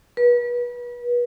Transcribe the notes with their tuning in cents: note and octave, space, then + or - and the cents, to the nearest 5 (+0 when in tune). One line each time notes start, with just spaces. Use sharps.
B4 -35